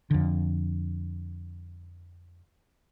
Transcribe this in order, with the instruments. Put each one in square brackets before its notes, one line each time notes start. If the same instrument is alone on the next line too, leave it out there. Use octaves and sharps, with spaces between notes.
[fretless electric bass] F2 D3